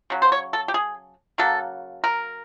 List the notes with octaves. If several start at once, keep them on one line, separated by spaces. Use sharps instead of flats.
C#3 F#3
C5
C#5
A4
G4
G#4
C#3 F#3 A#3 A4
A#4